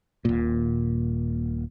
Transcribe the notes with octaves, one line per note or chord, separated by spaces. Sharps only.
D#1 A#2